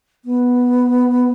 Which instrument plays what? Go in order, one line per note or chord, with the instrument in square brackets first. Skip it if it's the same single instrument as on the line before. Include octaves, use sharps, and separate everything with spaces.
[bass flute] B3